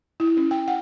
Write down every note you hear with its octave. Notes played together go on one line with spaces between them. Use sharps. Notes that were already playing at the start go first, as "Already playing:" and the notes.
E4
C#4
G5
F#5